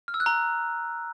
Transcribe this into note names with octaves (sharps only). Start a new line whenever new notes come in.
F6
E6
F#6
A#5